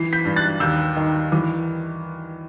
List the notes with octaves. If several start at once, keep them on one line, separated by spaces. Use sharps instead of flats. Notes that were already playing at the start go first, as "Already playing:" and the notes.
Already playing: E3 C7
G6 B6
G2
F#6 A6
D#2 E6 G6
D#3
E3